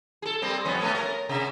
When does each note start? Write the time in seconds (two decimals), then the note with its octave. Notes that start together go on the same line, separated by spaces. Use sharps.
0.22 G#4 A4
0.42 G3 A#3 C4
0.65 F2 B3 C#4
0.82 A3 B3 C#4
0.95 A#4
1.29 C3 E5